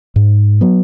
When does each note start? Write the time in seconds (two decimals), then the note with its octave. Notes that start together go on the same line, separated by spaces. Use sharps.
0.16 G#2
0.61 F#3 B3